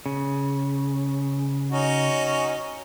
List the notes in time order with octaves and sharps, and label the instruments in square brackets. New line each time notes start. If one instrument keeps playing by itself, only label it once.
[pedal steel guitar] C#3
[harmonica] C#4 D#4 F#4